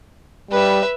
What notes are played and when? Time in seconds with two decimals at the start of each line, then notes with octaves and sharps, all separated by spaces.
0.51 G3 B4 E5